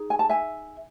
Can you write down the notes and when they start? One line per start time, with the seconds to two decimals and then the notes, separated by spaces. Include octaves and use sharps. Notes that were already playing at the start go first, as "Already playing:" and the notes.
Already playing: D#4 G#4
0.10 G#5
0.19 A5
0.29 E5 G#5